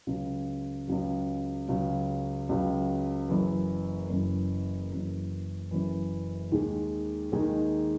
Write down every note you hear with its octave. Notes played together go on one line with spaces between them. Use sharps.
C#2 C#3 F#3
C#2 C#3 F#3
C#2 C#3 F#3
C#2 C#3 F#3
F#1 F#2 E3
F#1 F#2 E3
F#1 F#2 E3
F#1 F#2 E3
D#2 D#3 G#3 D#4 G#4
D#2 D#3 G#3 D#4 G#4